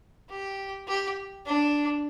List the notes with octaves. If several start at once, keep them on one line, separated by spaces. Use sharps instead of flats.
G4
G4
D4